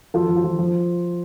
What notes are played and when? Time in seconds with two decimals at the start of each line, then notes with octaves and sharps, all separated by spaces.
0.14 F3 F4 A4
0.29 F3
0.36 F4
0.44 F3
0.58 F3